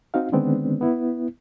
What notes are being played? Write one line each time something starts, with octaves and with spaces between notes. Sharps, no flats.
C4 D#4 F#4 F5
D3 D#3 G#3 B3 C4 D4
B3 E4